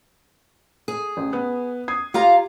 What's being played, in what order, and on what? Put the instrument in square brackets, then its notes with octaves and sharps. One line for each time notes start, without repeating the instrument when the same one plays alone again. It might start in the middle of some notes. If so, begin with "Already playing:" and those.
[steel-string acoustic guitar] G#4
[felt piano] A1
B3
D#6 G#6 C7
[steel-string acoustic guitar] F4 F5 A#5 [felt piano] G4